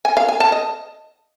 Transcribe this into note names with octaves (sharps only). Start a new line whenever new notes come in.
G#5
F5
G#5
A5
D#5